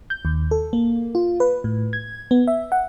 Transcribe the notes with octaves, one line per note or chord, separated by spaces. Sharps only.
G6
D#2
A4
A#3
F4
B4
A2
G#6
B3
E5
F#5